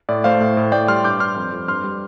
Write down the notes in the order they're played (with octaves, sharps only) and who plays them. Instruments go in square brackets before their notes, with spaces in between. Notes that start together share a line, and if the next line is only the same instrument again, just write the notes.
[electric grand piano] A2 D5
A3 C5 F5
A2
A2
A2 D5 G5
G3 C6 F6
G2 D6 G6
G2 C6 F6
F2
F2
G2 C6 F6
G3